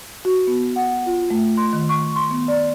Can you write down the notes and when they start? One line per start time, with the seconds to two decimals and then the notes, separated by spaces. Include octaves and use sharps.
0.25 F#4
0.47 B3
0.76 F#5
1.06 F4
1.30 A3
1.57 C6
1.73 D#3
1.89 C#6
2.16 C6
2.31 B3
2.48 D5